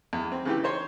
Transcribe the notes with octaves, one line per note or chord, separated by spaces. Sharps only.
E2
C4
C#3 E3 G4
D#4 C5 C#5 C6